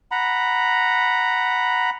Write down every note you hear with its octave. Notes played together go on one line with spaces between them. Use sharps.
F#5 A#5 B5